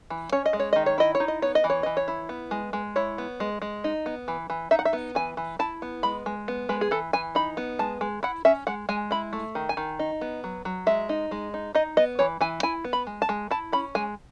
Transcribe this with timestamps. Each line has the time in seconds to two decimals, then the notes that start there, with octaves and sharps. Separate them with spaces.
0.10 E3
0.32 C#4 C#5
0.46 D#5
0.53 G#3
0.60 C#5
0.73 D#3 D#5
0.86 C#5
0.98 E4 D#5
1.15 C#5
1.20 D#4
1.28 D#5
1.42 B3 C#5
1.55 D#5
1.64 E3
1.70 C#5
1.83 E3 D#5
1.97 C#5
2.08 E4
2.29 B3
2.51 G#3
2.73 G#3
2.96 E4 C#5
3.18 B3
3.40 G#3
3.62 G#3
3.84 D#4
4.06 B3
4.28 E3
4.50 E3
4.71 D#4 E5
4.79 F#5
4.85 E5
4.93 B3
5.15 E3 G#5
5.37 E3
5.59 E4 A5
5.82 B3
6.03 G#3 B5
6.26 G#3
6.48 B3
6.69 G#3 B4
6.81 G#4
6.91 E3 A4
7.13 E3 G#5
7.35 D#4 B5
7.57 B3
7.79 G#3 A5
8.01 G#3
8.23 E4 F#5
8.45 C#4 E5
8.67 G#3 F#5
8.89 G#3 G#5
9.11 E4 B5
9.33 A3
9.55 D#3
9.69 G#5
9.77 D#3
9.99 D#4
10.21 B3
10.44 F#3
10.65 F#3
10.87 G#3 E5
11.09 D#4
11.31 G#3
11.54 D#4
11.75 D#4 D#5
11.97 B3 D#5
12.19 E3 C#5
12.41 E3 G#5
12.63 E4 G#5
12.84 B3
12.93 B5
13.07 G#3
13.22 A5
13.29 G#3
13.51 E4 A5
13.72 C#4 B5
13.95 G#3 G#5